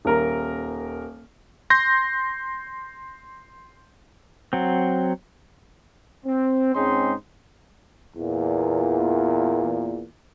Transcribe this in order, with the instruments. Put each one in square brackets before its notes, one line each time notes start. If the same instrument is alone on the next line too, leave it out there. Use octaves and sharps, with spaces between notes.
[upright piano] D#1 A#4 A#5
[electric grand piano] C6 G6 A#6
[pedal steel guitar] F#3 C4
[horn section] C4
G#2 G#3 C4 C#4 D#4 C6
[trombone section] E2 A#2